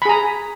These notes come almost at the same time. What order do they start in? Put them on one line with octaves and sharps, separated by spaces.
B5 G#4 A#5